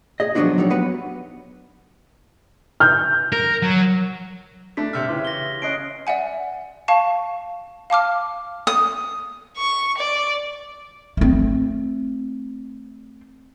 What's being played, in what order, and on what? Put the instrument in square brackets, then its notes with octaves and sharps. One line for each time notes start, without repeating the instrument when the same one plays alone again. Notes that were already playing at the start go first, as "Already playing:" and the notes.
[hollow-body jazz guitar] G#4 D#5
F3 F#3 A3 B3 D4 F#4
F#3 G3 D#4 C#5
B3 B4 F#5
[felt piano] F6 G6
[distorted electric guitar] A#4
F#3
[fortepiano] A3 D4 [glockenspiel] B6
[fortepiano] C3 E5 [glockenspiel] F6
[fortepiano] C#3 E3 G4 [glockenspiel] C6
[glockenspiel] A#6 G7
[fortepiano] C#4 D#5 [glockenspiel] F#6 C7 D7
[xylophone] D5 E5 F#5 G#5
F5 A5 C#6
F5 A5 D6 F6
[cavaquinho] D#6
[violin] C#6
D5
[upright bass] A3 C4